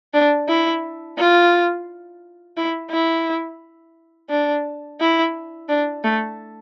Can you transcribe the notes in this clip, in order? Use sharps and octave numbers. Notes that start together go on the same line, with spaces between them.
D4
E4
F4
E4
E4
D4
E4
D4
A3